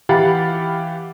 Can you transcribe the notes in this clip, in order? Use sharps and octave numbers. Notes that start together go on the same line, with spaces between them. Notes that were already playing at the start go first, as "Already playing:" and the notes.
E3 G4 F5 F#5 B5 A6